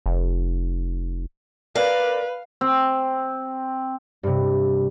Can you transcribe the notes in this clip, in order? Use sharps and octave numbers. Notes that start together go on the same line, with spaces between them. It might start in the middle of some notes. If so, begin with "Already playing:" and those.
F1
A#4 B4 D5 F5
C4
G2 C3